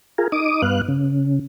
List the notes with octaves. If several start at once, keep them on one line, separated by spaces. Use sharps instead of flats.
F4 G#4 A#4
D#4 D6 D#6
G2 B3 F5 F#6
C#3